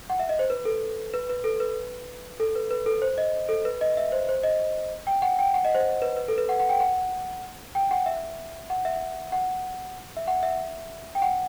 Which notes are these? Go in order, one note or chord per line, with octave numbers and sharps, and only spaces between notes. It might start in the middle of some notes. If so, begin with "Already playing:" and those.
F#5
E5
D#5
C5
B4
A4
B4
B4
A4
B4
A4
B4
B4
A4
C5
D#5
A4
B4
D#5
E5
C5
C5
D#5
G5
F#5
G5
F#5
D#5
C5
B4
B4
A4
B4
F#5
F#5
G5
F#5
G5
F#5
E5
F#5
E5
F#5
E5
F#5
E5
G5
F#5